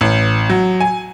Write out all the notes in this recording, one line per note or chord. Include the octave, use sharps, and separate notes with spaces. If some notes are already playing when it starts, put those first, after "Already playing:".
A1
F#3
G#5